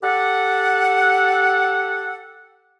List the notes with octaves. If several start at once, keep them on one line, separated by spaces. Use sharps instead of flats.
G4 A4 F#5